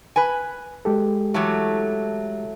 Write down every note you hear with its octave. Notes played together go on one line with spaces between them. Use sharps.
B4 G#5
G#3 G4 A4
E3 F#3 A3